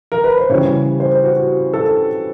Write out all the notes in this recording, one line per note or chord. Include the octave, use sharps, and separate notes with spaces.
A#4
B4
C5
C#3 E3 G3 C#5
C5
F#4
A4